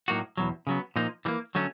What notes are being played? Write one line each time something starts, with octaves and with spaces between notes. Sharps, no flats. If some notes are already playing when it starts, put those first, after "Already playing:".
A2 F#3 A#3 D#4 F#4
E2 B2 F#3
C#3 F#3 B3
A#2 F3 A#3 D#4
E3 G3 A#3
D3 F#3 A3 C#4